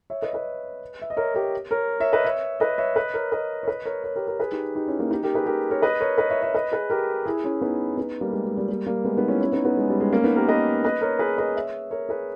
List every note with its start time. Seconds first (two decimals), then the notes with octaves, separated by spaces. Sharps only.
0.10 C#5 E5
0.22 B4 D#5
0.33 B4 D#5
1.02 E5
1.10 D#5
1.17 A#4 C#5
1.35 G4 A#4
1.71 A#4 C#5
2.00 C#5 E5
2.13 B4 D#5
2.24 C#5 E5
2.60 B4 D#5
2.78 C#5 E5
2.96 B4 D#5
3.14 A#4 C#5
3.32 B4 D#5
3.63 C#5
3.68 B4 D#5
3.85 A#4 C#5
4.04 A#4 C#5
4.16 G4 A#4
4.27 G4 A#4
4.39 G#4 B4
4.52 D#4 G4
4.75 D#4 G4
4.87 C#4 E4
4.99 A#3 C#4
5.11 D#4 G4
5.23 G4 A#4
5.34 G#4 B4
5.46 G4 A#4
5.70 A#4 C#5
5.82 B4 D#5
6.00 A#4 C#5
6.18 B4 D#5
6.30 C#5 E5
6.42 C#5 E5
6.55 B4 D#5
6.72 G#4 B4
6.90 G4 A#4
7.26 E4 G#4
7.44 C#4 E4
7.61 B3 D#4
7.97 B3 D#4
8.21 G3 A#3
8.33 G#3
8.45 G#3
8.57 G3 A#3
8.69 G3 A#3
8.86 G3 A#3
9.04 G#3 B3
9.17 B3 D#4
9.28 C#4 E4
9.40 C#4 E4
9.52 B3 D#4
9.65 B3 D#4
9.77 G#3
9.89 G3
10.00 G#3
10.12 A#3 C#4
10.24 B3 D#4
10.36 G4 A#4
10.48 B4 D#5
10.84 B4 D#5
11.01 A#4 C#5
11.19 G#4 B4
11.38 B4 D#5
11.56 C#5 E5
11.91 A#4 C#5
12.09 G#4 B4